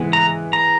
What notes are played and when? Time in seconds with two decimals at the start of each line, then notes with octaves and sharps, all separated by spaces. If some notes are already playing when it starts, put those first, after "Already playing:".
Already playing: E3 G#3 B3
0.13 A#5
0.53 A#5